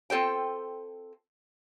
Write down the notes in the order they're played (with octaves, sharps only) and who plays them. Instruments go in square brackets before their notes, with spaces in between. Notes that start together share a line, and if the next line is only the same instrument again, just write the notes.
[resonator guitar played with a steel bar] C4 F4 A4 C5 G5